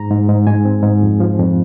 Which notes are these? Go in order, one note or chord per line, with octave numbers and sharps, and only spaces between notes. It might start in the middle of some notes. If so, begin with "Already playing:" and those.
Already playing: G#2 A#5
G#2
G#2
G#2 G#5
C4
G#2
F2
F3
F2